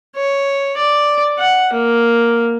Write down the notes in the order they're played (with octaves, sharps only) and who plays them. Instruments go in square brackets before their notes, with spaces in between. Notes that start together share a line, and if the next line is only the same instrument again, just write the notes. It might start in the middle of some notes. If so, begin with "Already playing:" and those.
[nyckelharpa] C#5
D5
F#5
A#3